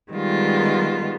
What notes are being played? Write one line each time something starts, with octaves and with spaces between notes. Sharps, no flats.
D#3 G3 G#3 B3 F4